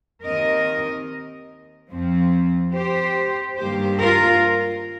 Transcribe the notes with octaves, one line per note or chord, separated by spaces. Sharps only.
D#2 D#3 C4 A#4 D#5
F2 F3 C4
G4 C5
G2 D#3 G3 A#3 G4 C5
F4 A#4